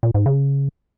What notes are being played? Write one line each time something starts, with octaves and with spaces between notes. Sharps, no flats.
A#2
G#2
C#3